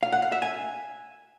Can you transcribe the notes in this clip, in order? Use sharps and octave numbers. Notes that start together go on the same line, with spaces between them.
F5
F#5
F5
E5
G#5